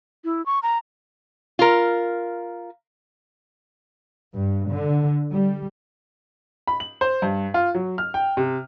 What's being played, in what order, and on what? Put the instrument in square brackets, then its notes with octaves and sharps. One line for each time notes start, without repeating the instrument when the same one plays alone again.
[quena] E4
C#6
A#5
[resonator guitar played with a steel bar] F4 A#4
[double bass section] G2
D3
G3
[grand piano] B5
F#7
C5
G2
F4
F#3
F6
G5
C3